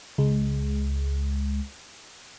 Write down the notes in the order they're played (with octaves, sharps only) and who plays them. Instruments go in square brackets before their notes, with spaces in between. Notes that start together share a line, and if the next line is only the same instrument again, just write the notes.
[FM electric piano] C#2 G#3